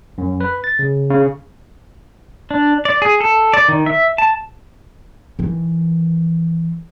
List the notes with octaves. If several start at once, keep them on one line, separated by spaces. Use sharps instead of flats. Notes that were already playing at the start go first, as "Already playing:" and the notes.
F#2
B4
A6
C#3
C#3
D4
D5
G#4
A4
D5
D#3
E5
A5
D#3 E3